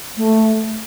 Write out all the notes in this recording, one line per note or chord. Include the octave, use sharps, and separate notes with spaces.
A3